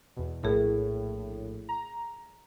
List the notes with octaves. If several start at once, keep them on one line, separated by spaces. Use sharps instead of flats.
E2 B2
A#1 A2 G#4 A#4
A#5